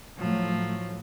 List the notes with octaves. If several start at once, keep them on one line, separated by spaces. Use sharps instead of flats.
A2 F3 F#3 A3